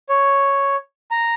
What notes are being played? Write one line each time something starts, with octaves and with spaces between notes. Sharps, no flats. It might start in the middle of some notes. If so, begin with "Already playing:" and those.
C#5
A#5